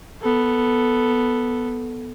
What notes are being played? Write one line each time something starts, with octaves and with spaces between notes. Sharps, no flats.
B3 A4